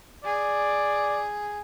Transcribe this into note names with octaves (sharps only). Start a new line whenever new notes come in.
G#4 D5